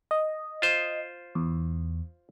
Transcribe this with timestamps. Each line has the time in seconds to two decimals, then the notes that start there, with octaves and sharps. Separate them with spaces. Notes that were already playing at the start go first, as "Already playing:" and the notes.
0.11 D#5
0.62 F4 C5
1.35 E2